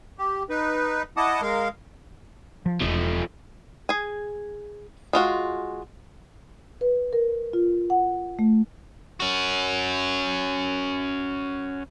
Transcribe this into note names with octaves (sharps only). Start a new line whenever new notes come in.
G4
D#4 B4
E4 D#5 F#5 A5 D6 D#6
G#3 A#4 F5
F3
E1 F3 A3
G#4 G#5
G#3 F4 F#4
B4
A#4
F4
F#5
A3
C#4 F#4